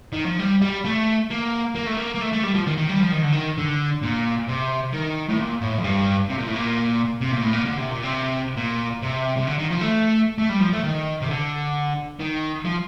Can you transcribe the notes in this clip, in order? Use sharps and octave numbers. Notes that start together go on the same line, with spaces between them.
D#3
F3
G3
G3
A3
A#3
A#3
A3
A#3
A#3
A3
A3
G3
F3
D#3
D#3
G3
F3
D#3
D3
D#3
D3
A#2
C3
D#3
A2
A#2
A2
F2
G2
C3
A#2
A2
A#2
C3
A#2
A2
A#2
D3
C3
A#2
C3
A#2
C3
C3
D3
D#3
F3
A3
A3
G3
F3
A3
D#3
C3
D3
D#3
F3